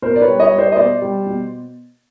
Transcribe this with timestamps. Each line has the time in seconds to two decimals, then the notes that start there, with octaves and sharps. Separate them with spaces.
0.02 B2 A#4 C5
0.16 D5
0.21 B4 C#5
0.27 G3
0.40 C#5 D#5
0.52 G3
0.58 C5 D5
0.72 D#5
0.76 B2 C5 D5
1.02 G3
1.26 B2